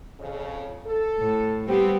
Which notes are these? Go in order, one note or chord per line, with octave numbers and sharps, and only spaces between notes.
F2 C#3
A4
A2
G3 B3 C4 G4